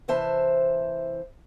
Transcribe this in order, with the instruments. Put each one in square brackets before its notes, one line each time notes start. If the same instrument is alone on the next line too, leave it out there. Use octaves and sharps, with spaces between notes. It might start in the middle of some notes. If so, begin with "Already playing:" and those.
[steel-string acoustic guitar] C3 E3 C5 E5 A5